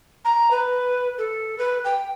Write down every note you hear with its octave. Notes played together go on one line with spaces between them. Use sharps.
A#5
B4
A4
B4
G5